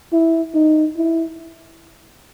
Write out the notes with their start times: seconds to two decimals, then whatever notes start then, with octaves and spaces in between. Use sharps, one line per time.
0.13 E4
0.54 D#4
0.97 E4